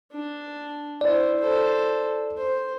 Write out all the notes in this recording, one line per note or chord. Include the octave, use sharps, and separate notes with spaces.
D4
E4 C5 D5
A4 C5
C5